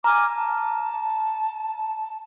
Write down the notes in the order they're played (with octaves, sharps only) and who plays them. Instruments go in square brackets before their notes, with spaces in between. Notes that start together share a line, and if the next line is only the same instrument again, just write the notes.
[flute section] G#5 D6 F6 [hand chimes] A#5
[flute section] A5